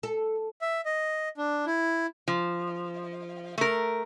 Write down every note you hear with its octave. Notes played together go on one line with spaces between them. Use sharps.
A4
E5
D#5
D4
E4
F3
A3 A#4